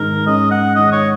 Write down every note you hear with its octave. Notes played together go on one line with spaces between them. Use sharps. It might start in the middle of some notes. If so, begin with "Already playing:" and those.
Already playing: G#2 D#3 G#3 D#4 A#4
G#2 G#3 C#4 D#5
F#5
G#2 D#3 G#3 D#4 D#5
C#5